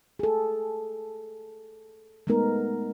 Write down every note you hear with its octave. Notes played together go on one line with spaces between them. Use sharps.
G#4 A4
G#3 A3 B3 D#4 A#4